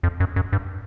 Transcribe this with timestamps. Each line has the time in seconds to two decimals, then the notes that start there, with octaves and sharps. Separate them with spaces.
0.03 F2
0.20 F#2
0.36 F#2
0.53 G2